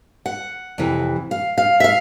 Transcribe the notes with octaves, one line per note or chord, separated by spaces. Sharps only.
F#5
F2 C3 E3
F5
F5
E5
F5